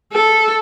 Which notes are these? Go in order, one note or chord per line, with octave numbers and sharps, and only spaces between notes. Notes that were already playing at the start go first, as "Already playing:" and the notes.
A4